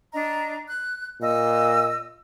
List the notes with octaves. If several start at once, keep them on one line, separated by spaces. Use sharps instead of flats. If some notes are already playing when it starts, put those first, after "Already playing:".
D4 D#5 A#5
F#6
A#2 D#5 E6